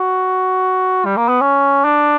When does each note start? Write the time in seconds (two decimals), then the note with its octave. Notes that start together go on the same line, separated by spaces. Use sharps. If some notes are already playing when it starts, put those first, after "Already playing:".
Already playing: F#4
1.06 G3
1.17 A#3
1.29 B3
1.41 C#4
1.85 D4